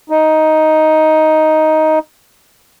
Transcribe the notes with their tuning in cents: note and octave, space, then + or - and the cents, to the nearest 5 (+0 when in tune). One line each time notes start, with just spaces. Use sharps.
D#4 +10